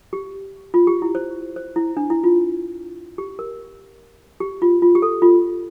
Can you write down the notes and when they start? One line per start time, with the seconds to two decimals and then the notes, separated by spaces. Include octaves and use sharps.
0.13 G4
0.74 F4
0.87 G4
1.02 E4
1.15 C5
1.56 C5
1.76 E4
1.97 D4
2.10 E4
2.24 F4
3.18 G4
3.39 A#4
4.40 G4
4.62 F4
4.82 F4
4.95 G4
5.02 A4
5.22 F4